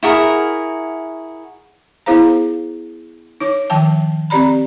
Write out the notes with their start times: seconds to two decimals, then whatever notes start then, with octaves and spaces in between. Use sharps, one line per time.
0.03 E4 F#4 G#4 A#4
2.06 B3 E4 G#4 C5 F5 A#5
3.40 D#4 C#5 D6
3.70 D#3 F3 G5 A5
4.30 C4 G4 D5 A#5 B5